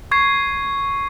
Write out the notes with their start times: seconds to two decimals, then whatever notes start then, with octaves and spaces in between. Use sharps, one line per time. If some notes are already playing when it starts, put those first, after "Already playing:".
0.11 C#6 G#6 C7